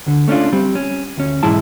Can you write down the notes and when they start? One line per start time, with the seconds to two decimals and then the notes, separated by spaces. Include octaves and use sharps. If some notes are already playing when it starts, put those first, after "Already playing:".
0.06 D2 D3
0.28 A3 C#4 D4 F4
0.53 G3 C4
0.75 C#4
1.17 D2 C#4
1.43 B1 G#2 E3 G#3 E4 A5